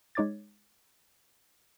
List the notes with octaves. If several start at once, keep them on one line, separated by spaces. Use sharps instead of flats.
G#3 D#4 C#5 D6 G#6 A6